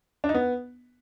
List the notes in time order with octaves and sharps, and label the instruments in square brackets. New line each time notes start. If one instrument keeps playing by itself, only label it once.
[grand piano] D4
D#4
B3